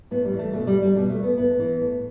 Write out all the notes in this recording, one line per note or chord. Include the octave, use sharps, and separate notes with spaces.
A2 B3
G3
E3
A3
B2 A3
G3
G3
B2 G3
A3
B3
A2 B3
E3
A2